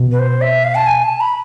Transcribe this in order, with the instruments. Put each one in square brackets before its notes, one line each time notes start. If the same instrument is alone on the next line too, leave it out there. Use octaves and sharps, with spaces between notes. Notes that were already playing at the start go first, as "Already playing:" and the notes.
Already playing: [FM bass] B2
[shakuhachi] B4
C5
E5
F5
A5
G#5
A5
B5